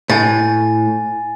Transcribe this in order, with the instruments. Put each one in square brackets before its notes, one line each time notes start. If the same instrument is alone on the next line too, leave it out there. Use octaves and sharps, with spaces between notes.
[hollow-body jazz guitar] A2 [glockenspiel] G#5 A6